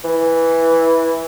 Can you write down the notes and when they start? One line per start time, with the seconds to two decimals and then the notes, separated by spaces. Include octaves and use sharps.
0.04 E3